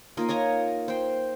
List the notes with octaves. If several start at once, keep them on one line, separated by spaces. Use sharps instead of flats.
A#3 D#4 F4 D#5
C#5 D#5 G#5 A#5
C5 G5